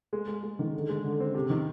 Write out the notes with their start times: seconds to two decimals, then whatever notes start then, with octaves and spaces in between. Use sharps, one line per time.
0.13 G#3
0.28 G#3
0.43 G#3
0.59 D#3
0.74 D3
0.89 G#3
1.04 D3
1.20 C4
1.34 C3
1.50 D#3